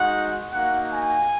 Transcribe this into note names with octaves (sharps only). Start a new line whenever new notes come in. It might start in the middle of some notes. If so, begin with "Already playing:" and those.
Already playing: G#3 D#4 F#4 F#5
A#3 D#4 F#4 F#5
G#5